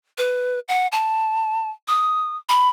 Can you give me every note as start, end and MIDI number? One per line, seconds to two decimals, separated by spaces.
0.18 0.59 71
0.68 0.87 78
0.92 1.70 81
1.88 2.37 87
2.49 2.69 83